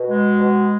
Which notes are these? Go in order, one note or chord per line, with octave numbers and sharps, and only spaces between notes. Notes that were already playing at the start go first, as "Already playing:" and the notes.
Already playing: B2
G#3
B2